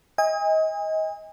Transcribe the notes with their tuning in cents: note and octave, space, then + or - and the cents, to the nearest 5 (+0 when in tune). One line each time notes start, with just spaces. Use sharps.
D#5 +25 G#5 -35